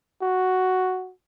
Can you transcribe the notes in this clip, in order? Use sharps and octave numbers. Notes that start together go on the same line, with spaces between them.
F#4